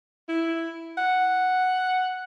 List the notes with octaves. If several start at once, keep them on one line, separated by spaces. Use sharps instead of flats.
E4
F#5